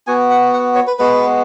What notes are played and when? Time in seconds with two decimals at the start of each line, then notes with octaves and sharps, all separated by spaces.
0.07 B3 F#4 G#5
0.30 F#5
0.53 F#5
0.75 C#5
0.87 B4
0.98 G#3 B3 F#4 B4